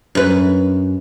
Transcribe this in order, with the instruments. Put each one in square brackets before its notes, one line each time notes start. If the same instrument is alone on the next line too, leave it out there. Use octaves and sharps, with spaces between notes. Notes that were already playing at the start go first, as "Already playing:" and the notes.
[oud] F#2 B4